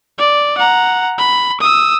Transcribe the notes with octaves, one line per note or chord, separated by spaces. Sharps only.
D5
F#5 A#5
B5
D#6 E6